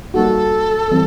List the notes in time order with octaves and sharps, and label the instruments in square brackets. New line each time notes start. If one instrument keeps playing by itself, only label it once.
[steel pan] G3 A#3 D#4 F#4 [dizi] A4
[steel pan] E3 G3 C4